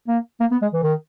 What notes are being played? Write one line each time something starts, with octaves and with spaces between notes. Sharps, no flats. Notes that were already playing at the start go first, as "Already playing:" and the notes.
A#3
A#3
B3
G#3
E3
D#3